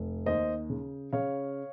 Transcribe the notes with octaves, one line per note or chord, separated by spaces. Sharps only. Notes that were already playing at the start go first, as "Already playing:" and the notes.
Already playing: F1
D#2 C5 D#5
C#3
C#3 C#5 F5